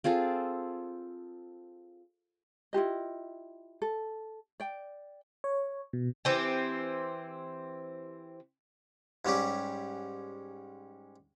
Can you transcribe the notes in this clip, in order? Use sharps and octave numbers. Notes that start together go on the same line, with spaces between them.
C4 F4 G#4 A4
E4 F4 G4 D#5
A4
D5 G5
C#5
B2
E3 C4 G4
G#2 G3 C#4 G4